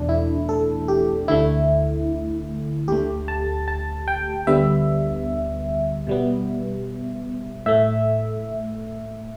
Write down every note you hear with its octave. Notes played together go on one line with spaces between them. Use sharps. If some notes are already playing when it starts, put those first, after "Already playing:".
Already playing: E2 B2 A3 D4
E4
A4
G4
D2 D3 A3 E4
D2 D3 A3 G4
A5
A5
G5
D2 D3 G3 B3 E5
B2 G3 B3
A2 A3 E5